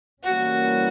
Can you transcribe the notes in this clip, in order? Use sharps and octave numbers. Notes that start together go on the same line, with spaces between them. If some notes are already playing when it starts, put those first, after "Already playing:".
E3 G3 A#3 C#4 F#4